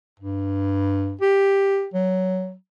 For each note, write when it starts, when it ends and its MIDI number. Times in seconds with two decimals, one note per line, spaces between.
0.19 1.15 43
1.21 1.87 67
1.94 2.54 54